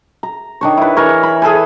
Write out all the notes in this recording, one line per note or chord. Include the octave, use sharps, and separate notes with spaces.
A#5
D#3 D4 C#5
E4 B4
E3 A#4 C#5
B5
G#4 A4 B4 G#5